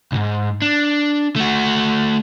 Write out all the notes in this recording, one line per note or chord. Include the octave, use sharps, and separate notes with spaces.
B1 G#2
D4
A3 F#4